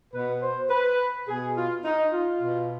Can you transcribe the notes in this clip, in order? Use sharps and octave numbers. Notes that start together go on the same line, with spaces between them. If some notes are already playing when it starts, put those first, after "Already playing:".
B2 B4
C5
B4
B2 G#4
F4
D#4
F4
B2